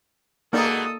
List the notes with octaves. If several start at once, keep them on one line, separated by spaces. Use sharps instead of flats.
B2 G#3 A#3 B3 D#4 A4 D5 D#6